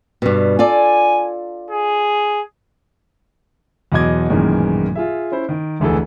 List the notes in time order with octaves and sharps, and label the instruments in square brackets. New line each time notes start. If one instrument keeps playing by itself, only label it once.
[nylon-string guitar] G2 B2
[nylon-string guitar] F4 A4 D5 [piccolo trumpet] G#5
[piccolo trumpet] G#4
[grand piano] E2 B2 F#3 D#5 D6 G#6
A1 F#2 A#2 D#3 E3 G#3
F4 G#4 E5
C#4 E4 C5
D#3
F1 D2 E3 G#4 A4